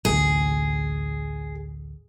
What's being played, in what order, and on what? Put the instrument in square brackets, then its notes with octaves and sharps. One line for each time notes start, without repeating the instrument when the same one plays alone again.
[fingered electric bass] A1 D2 [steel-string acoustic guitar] G#4